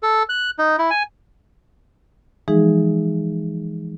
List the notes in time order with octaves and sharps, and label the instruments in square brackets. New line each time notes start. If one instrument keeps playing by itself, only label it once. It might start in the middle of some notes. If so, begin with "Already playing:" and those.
[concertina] A4
F#6
D#4
E4
G#5
[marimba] E3 F3 G#3 D#4 G#4